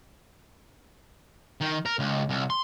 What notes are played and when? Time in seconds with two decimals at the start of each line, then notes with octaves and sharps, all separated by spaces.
1.61 D#3
1.86 A#4
1.99 C#2
2.29 C2
2.50 C6